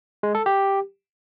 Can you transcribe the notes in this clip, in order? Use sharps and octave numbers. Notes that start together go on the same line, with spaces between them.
G#3
A4
G4